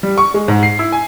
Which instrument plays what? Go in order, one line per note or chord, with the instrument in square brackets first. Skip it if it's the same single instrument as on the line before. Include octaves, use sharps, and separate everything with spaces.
[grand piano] G3
C#6
G#3
G#2
C7
E4
G#5